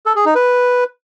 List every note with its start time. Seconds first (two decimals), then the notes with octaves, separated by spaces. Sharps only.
0.06 A4
0.16 G#4
0.25 D#4
0.35 B4